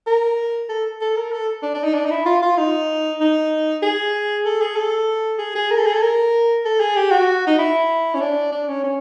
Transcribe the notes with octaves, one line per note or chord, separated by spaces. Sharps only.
A#4
A4
A4
A#4
A4
D4
D4
D#4
D4
D#4
E4
F4
F4
D#4
D#4
G#4
A4
G#4
A4
G#4
G#4
A#4
A4
G#4
A4
A#4
A4
G#4
G4
F#4
D#4
E4
C#4
D4
D4
C#4
C#4